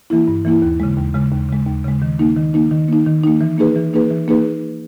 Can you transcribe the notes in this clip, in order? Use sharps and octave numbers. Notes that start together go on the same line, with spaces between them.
E3 A#3 E4
G2
E3 A#3 E4
D#2
C#3 G#3
D#2
C#3 G#3
D#2
C#3 G#3
D#2
C#3 G#3
D#3
A#3 D#4
D#3
A#3 D#4
D#3
A#3 D#4
D#3
A#3 D#4
E3
A#3 D#4 G#4 B4
E3
A#3 D#4 G#4 B4
E3
A#3 D#4 G#4 B4